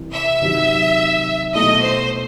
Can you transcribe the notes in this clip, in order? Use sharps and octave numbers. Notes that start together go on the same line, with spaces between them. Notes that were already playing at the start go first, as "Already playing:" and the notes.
Already playing: C2 C3 E3
E5
C3 D#3 F#3
B2 A3 E4 D#5
C5